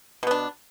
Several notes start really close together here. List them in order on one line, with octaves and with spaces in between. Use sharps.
B2 B3 D4